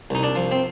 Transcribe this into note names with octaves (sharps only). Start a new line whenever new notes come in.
C2 D#4
D4
F3
C4